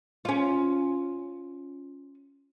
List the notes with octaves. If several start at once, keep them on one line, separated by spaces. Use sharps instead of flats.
C#4 F4